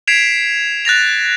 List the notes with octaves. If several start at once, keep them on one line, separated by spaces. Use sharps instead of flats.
G#6 B6 C7 D7 E7 F7
F#6 A6 A#6 F7